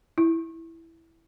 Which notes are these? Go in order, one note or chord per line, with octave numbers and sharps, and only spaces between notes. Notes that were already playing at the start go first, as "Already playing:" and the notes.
E4